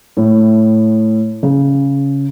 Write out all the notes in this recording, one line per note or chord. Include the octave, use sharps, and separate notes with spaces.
A2
C#3